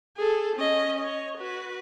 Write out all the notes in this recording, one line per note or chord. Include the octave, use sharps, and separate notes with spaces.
G#4 A4
C#4 D#5
C#5 D#5
F#4 B4